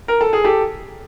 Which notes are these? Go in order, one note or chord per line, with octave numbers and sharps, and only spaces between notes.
A#4
A4
G#4
G4 A4